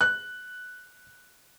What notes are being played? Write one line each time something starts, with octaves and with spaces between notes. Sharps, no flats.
F#6